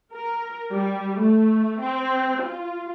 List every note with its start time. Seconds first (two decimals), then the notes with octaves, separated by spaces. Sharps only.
0.14 A#4
0.72 G3
1.20 A3
1.81 C4
2.44 F4